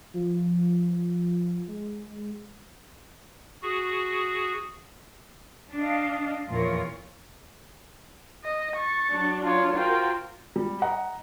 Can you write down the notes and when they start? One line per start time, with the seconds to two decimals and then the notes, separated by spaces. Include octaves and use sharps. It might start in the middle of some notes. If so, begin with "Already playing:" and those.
0.14 F3
1.68 G#3
3.62 F#4 G#4
5.75 D4 D#5 F5
6.49 E2 A#2 F3 F4 A#4 C#5
8.44 D#5
8.76 C#6 A6
9.10 F#3 D4
9.44 F4 C#5
9.73 F4 F#4 A#4 C5 G5
10.56 G3
10.82 D#5 F#5 A#5